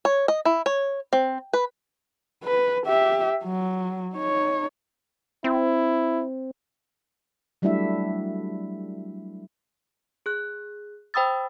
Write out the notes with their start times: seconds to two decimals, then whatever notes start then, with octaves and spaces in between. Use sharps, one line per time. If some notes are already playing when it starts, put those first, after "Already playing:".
0.05 C#5
0.28 D#5
0.45 E4
0.66 C#5
1.13 C4
1.53 B4
2.45 B4
2.86 G4 E5
3.44 F#3
4.15 D#4 C#5
5.44 C4 E4
7.62 F#3 G3 A3 D4 E4 E5
10.26 G#4 F#6
11.14 C5 G5 B5 D#6 E6 A6